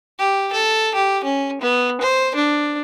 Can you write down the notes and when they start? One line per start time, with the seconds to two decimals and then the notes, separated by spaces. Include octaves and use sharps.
0.19 G4
0.53 A4
0.95 G4
1.24 C#4
1.61 B3
2.01 C5
2.35 D4